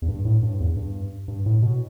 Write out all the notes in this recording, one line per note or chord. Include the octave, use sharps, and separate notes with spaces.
E2
G2
A2
G2
E2
G2
G2
A2
B2